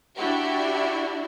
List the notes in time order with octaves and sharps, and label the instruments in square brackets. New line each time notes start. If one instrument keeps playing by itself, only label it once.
[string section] D4 E4 F#4 G4